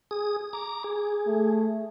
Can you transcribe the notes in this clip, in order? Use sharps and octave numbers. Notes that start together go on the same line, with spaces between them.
G#4 D#6
A#5 D6
G#4
A3